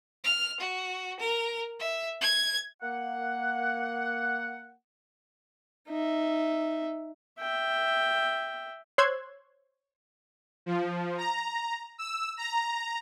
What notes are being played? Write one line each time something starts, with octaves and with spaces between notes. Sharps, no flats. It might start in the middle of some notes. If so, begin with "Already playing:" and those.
F6
F#4
A#4
E5
G#6
A#3 F#5
D#4 E5
E5 G5
C5 C#5 C6 E6 F#6 G#6
F3
A#5
E6
A#5